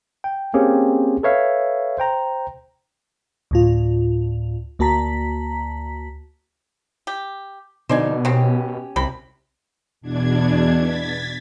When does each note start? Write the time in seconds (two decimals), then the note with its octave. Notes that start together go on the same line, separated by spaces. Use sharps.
0.24 G5
0.54 A#3 C4 C#4 G4 G#4
1.23 A4 B4 C#5 E5 F5
1.98 C5 G5 A#5
3.51 D2 A2 F4
4.79 D2 A#3 F#4 A5 A#5 B6
7.07 G4
7.89 F2 B2 D3 D#4 C5 D5 G#5
8.25 D#3 C4 C#4 G4
8.96 C2 C3 B5
10.01 E2 B2 D4 G#6
10.79 G#6 A6 B6